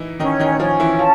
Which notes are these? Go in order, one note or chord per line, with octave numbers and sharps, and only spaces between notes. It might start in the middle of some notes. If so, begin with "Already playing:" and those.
Already playing: E3 D#4 E4
D#3 C#4 D#4
D#3 D#4
F3 C#4 F4
E3 E4
F4 A5